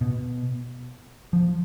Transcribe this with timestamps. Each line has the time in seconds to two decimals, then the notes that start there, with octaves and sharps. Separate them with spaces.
0.01 B2
1.33 F3